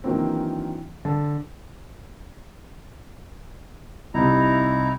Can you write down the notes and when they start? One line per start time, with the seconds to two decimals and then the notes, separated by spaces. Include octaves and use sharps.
0.04 D#3 E3 F#3 A#3 C4 D4
1.05 D3 A5
4.14 C2 C3 D#4 E4 A#5